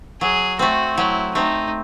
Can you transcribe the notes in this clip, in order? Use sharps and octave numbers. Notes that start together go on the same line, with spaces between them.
F#3 G#4
A3 C4 F#4
F#3 E4
A3 C4 D#4